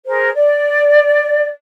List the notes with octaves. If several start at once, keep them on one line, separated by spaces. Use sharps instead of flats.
G#4 A#4 C5
D5